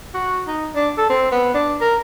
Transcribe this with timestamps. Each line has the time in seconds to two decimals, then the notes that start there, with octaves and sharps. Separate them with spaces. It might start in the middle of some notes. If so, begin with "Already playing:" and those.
0.14 F#4
0.47 D#4
0.76 D4
0.98 A4
1.10 C4
1.32 B3
1.54 D4
1.81 A#4